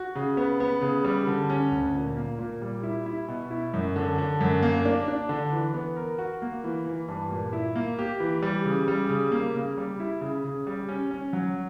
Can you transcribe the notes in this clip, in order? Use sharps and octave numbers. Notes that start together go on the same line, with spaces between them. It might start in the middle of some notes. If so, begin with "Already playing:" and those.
Already playing: F#4
C#3
B3
B3
C#3
G3
D3
C#4
D2
A#2
A#3
A#2
G3
E4
E4
B2
E4
F#2
D3
D3
F#2
A#3
D4
D4
D3
E3
B3
A#4
F#4
A#3
E3
E3
G2
A#2
E4
A#3
G4
E3
G3
C#3
G3
C#3
A#3
C#3
G3
E4
C#3
C#3
G3
C#4
C#4
F#3